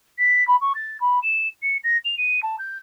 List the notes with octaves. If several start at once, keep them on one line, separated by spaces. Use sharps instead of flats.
B6
B5
C#6
A6
B5
E7
C#7
A#6
F7
D#7
A5
G6